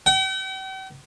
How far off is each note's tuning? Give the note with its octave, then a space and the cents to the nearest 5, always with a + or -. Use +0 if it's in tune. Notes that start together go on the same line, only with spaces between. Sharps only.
G5 -45